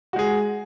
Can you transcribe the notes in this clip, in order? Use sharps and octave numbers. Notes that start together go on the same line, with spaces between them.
G#3 F#4 G#4